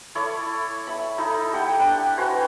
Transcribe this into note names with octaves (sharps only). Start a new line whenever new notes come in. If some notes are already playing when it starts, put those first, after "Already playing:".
E4 A4 C#5 D5
E5 B5
D#4 E4 A4
G4 F#5 G5
D4 G5
F#4 B4 C5 G#5